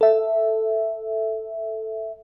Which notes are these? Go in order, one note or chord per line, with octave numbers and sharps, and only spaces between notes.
A4 E5